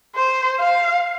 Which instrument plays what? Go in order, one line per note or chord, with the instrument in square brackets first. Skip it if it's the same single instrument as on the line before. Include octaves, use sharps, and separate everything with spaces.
[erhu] C5
F5